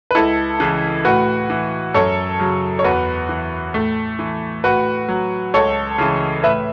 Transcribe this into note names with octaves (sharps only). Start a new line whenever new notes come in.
B4
C#2 E4 A4
C#3 E3
A2 F#4 B4
E3
F#2 A4 C#5
C#3 F#3
C#5
E2 F#4 B4
E3
A2 A3
E3
A2 F#4 B4
F#3
C#2 A4 C#5
C#3 E3
A2 B4 E5